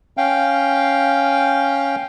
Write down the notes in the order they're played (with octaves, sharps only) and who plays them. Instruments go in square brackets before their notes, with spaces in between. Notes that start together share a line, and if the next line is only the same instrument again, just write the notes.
[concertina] C#4 F5 G5